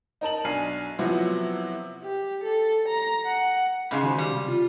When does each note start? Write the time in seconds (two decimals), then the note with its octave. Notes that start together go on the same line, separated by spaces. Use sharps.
0.21 D#4 A#4 A5 F#7
0.44 B1 D4 G#5 F6 C7
0.99 C3 F3 F#3 B3 E4 F#4
2.04 G4
2.44 A4
2.88 A#5
3.25 F#5
3.91 G#2 C#3 D#4 D#5 B5
4.03 D#3 F#4 C5
4.18 G3
4.32 C3
4.48 F4